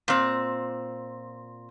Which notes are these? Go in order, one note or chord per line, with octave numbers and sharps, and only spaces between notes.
A#2 C4